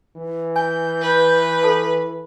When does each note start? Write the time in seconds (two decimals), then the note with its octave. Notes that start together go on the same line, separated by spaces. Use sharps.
0.16 E3
0.56 G#5 G6
1.01 B4
1.63 A4 A5 C#6